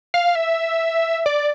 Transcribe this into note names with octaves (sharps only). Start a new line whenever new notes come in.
F5
E5
D5